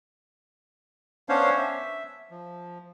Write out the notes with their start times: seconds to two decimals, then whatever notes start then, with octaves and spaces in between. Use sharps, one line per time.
1.29 B3 C#4 D4 C5 C#5 F5
1.56 E5
2.31 F3